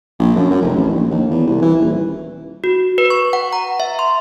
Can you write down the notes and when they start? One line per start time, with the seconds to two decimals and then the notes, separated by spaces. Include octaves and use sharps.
0.20 A#1
0.36 F#2
0.50 F#2
0.62 F1
0.76 A1
0.96 A#1
1.11 D#2
1.31 E2
1.47 C2
1.62 E3
1.80 D#1
2.64 F#4
2.98 B4
3.10 C#6
3.33 F#5
3.53 A#5
3.80 E5
3.99 C6